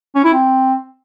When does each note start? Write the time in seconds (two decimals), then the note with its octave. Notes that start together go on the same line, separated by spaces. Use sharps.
0.15 C#4
0.24 E4
0.33 C4